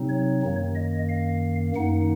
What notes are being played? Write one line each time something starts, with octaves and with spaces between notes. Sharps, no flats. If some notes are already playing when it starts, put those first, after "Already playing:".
Already playing: C3 F#3 C4 D#4
C#5
F#2 D#3 A#3
D#5
F5
F#2 D#3 A#3 D#4 F#5